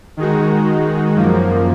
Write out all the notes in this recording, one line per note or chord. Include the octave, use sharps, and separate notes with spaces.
D#3 G#3 D#4 F#4
F#2 F3 A#3